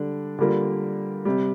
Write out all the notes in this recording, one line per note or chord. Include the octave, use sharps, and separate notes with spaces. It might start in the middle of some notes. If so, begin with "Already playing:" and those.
Already playing: D3 G3 D4
D3 G3 A#3 F4
C3 G3